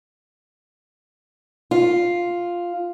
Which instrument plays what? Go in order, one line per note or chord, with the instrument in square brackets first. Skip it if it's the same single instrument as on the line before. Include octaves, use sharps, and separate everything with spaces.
[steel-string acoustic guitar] F4